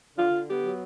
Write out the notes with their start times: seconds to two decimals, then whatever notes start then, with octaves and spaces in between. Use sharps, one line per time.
0.16 D3 F4
0.31 D3
0.47 B3 G4
0.63 F#3